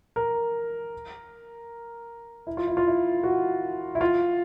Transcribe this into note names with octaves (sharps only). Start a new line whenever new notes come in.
A#4
E4
F4
E4
F4
E4
F#4
E4
F4